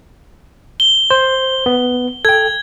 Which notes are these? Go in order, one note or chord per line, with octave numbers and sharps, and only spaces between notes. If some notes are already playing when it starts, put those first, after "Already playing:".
G7
C5
B3
A4 G5 G#6